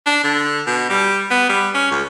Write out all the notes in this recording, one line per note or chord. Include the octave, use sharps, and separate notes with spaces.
D4
D3
B2
G3
B3
G3
C#4
C#2